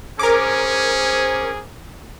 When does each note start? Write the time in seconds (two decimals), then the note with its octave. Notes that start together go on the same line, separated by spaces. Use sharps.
0.19 C#4 G#4 A#4 C5 D6